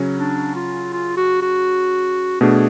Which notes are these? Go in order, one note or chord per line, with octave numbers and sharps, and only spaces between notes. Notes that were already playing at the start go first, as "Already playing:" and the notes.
Already playing: C#3 F#3 C#4
D4
F4
F4
F#4
F#4
B2 A3 D4 G#4